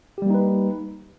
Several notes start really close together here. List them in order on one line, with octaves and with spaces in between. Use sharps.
G4 G3 A#3 D#4 B4